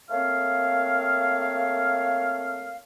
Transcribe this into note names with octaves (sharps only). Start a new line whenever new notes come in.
A3 A#3 C4 C#5 F5